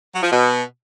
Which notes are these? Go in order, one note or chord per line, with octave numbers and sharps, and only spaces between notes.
F#3
F3
B2